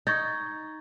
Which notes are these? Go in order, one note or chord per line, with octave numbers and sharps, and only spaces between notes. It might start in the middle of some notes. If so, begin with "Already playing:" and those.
D#4 C#6 G#6 A6